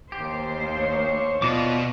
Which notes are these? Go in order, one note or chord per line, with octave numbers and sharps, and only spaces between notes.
D#2 G4 C5
C#5
B2 F4 D5 D#5 D6